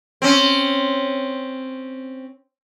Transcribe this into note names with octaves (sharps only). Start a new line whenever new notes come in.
C4 C#4